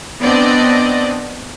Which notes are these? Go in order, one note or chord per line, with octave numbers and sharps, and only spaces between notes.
B3 C4 D4 D5 D#5